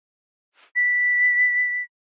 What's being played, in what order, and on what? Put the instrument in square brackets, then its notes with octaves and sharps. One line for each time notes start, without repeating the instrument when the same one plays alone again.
[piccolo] B6